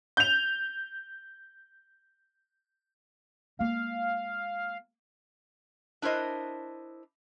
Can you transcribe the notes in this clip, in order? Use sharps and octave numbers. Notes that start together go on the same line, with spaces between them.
G6 F7
G#3 A#3 F5
D4 E4 A#4 C5 D#5